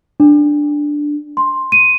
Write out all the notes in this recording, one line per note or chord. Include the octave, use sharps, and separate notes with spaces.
D4
C6
D#7